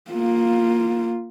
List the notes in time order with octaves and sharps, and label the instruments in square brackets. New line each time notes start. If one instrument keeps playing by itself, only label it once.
[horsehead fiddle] A#3 F4